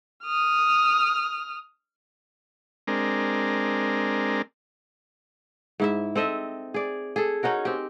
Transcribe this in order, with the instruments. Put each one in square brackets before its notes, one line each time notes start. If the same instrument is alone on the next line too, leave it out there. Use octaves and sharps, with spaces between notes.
[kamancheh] D#6 F6
[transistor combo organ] G#3 C4 D4 A#4
[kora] G#2 E4 E5
C4 A4 D#5 E5
G#4 D5
G#4 A4
C#4 D#4 F#4 A#4
C4 G4